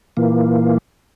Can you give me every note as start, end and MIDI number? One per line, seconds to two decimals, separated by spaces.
0.17 0.78 46
0.17 0.78 52
0.17 0.78 58